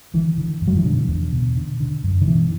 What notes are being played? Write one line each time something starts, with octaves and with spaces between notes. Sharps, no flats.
D3 E3
D3
F#2
F#3
E3
B2 D3
E2
B2
D3
D3
F#2
D3
B2 E3